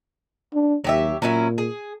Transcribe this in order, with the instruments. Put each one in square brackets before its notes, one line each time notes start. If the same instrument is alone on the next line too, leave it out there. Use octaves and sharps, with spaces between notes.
[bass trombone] D4
[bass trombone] D#2 [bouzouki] F#3 G4 E5
[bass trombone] A#2 [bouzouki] F#3 C#4 E4
[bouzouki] G#4